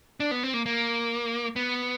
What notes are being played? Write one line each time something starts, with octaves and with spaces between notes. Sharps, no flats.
D4
B3
C4
A#3
A#3
B3